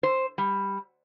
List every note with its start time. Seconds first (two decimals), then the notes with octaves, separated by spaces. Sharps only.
0.03 C5
0.38 G3